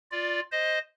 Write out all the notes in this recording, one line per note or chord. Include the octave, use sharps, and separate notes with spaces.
F4 D5
C5 D#5